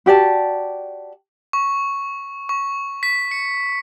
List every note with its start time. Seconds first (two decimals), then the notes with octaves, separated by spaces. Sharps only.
0.06 F#4 G4 D5 A5
1.53 C#6
2.49 C#6
3.03 B6
3.31 C#7